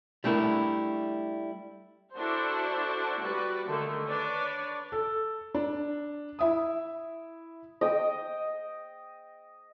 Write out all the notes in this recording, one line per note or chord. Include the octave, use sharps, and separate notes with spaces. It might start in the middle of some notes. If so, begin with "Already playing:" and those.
G3 A3 D4 E4 A#4
D4 E4 F#4 A4 C5
G3 F#4 B4 D5
D3 D#3 A3 A4
D4 B4 C#5 D5
A4
D4
E4 E5 D#6
D#5 G5